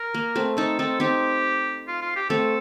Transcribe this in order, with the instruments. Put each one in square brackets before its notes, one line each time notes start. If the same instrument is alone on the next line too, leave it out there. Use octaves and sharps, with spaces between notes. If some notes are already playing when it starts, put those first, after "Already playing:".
Already playing: [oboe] A#4
[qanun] A#3
A3 C4
[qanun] C4 D#4 [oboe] A4
[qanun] C4 D#4 [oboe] A4
[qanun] C4 D#4 [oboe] G4
[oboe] F4
F4
G4
[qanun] A3 C4 [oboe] A4